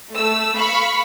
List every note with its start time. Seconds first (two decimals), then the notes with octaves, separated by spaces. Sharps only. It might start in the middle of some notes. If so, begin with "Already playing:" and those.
0.13 A3 E6
0.56 F5 B5 C#6